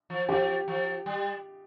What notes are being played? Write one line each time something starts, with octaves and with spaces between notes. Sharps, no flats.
F3
F3 G4
F3
G3